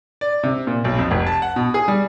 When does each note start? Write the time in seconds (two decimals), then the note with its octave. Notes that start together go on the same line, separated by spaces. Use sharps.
0.21 D5
0.43 C3
0.67 A#2
0.84 B1
0.99 F2
1.11 F1
1.27 A5
1.42 F#5
1.56 B2
1.74 G#4
1.88 G3